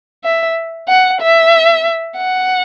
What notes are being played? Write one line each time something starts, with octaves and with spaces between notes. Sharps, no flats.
E5
F#5
E5
F#5